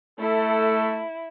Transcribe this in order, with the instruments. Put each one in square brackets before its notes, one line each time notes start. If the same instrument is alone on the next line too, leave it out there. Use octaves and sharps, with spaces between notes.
[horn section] A3 A4 [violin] E4